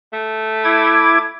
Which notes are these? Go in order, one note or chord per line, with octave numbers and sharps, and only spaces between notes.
A3
E4 D6 G#6